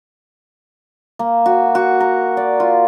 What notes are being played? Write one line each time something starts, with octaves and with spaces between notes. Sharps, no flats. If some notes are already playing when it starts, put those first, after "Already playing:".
A#3
F#4
F#4
A#4
D5
F4